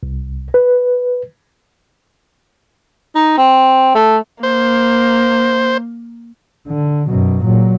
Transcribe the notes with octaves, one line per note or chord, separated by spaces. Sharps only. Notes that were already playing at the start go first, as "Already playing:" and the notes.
C2
B4
D#4
C4
A3
A#3 C5
D3
F#2 B2
A#2 F#3